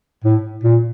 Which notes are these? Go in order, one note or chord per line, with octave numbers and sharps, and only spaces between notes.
A2
A#2